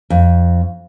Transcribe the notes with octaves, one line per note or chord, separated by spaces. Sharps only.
F2